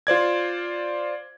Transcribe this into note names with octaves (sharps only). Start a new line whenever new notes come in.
F4 C5 D5 G#6